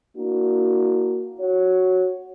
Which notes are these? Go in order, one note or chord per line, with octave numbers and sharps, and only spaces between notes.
A#3 D4 E4 F#4
F#4 C#5